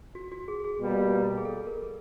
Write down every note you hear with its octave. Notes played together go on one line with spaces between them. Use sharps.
F#4
F#4
G#4
G#4
B2 G3 A#3
G#4
A4
A#4